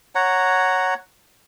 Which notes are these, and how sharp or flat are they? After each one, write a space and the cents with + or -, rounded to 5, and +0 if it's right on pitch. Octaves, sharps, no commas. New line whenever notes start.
C#5 +0 F#5 +0 A#5 -10